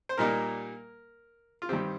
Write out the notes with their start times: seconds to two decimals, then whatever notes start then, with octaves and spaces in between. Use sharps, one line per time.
0.09 C5
0.17 A#2 G3 A#3 D#4 A#4
1.62 F4
1.69 G2 D#3 G3 C4 G4